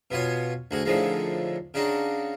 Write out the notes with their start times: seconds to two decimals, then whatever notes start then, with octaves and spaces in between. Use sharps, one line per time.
0.11 B2 B3 F4 C#5 G#5
0.71 D2 F#4 G#4
0.85 A2 D3 D#3 F3 G#3
1.74 C#3 D4 D#4 F#4